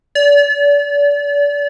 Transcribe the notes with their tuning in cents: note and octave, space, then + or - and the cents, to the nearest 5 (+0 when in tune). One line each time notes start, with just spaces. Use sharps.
D5 -35